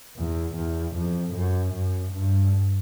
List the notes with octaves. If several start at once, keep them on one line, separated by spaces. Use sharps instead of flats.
E2
E2
F2
F#2
F#2
G2